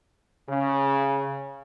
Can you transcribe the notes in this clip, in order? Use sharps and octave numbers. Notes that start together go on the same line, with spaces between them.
C#3